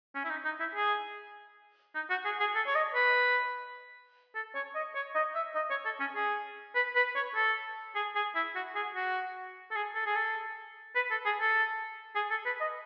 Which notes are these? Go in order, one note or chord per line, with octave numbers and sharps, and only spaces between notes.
C#4
E4
D#4
D#4
E4
G#4
D#4
F#4
G#4
G#4
A4
C#5
D#5
B4
A4
C#5
D#5
C#5
D#5
E5
D#5
C#5
A4
C#4
G#4
B4
B4
C#5
A4
G#4
G#4
E4
F#4
G#4
F#4
A4
G#4
A4
G#4
A4
B4
A4
G#4
A4
G#4
A4
B4
D#5